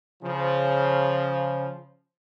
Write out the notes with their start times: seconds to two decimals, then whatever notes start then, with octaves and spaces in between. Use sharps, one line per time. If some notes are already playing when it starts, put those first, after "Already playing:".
0.23 C#3 F3